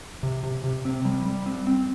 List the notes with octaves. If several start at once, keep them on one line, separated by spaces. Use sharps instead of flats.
C3
C3
C3
C4
G3
G3
C4
C4